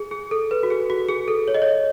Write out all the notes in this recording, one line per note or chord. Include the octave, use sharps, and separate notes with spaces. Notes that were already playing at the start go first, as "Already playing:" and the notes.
Already playing: G#4
G#4
A4
B4
F#4
G#4
F#4
G#4
A4
C#5
D#5
C#5